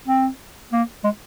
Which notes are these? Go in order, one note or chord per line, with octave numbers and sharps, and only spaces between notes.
C4
A#3
G#3